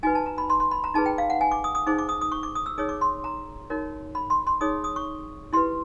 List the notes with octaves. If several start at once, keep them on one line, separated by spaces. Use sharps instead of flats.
D#4 F#4 B4 G#5
A5
A#5
B5
C6
C6
B5
A#5
D#4 G#4 B4 A5
G5
F5
F#5
G#5
D6
D#6
D#6
D#4 G#4 C5 D6
D6
D#6
D#6
C#6
D6
D#6
E6
D#4 G#4 C#5 D#6
D6
C6
A#5
D#4 F#4 A#4 C#5
B5
C6
C6
D#4 G#4 C#5 D#6
D#6
C#6
E4 G4 B4 C6